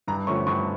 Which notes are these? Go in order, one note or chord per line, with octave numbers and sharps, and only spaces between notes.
G2 A#5
D3 F3 A3 C#4 C#6
G2 C#6